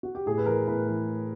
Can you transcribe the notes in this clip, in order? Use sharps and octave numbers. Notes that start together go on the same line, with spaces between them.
F#4
G4
A2 G#4
B4
E3 A#4
A2 B4
E3